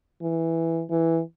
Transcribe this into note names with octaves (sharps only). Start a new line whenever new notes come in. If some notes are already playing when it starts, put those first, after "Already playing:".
E3
E3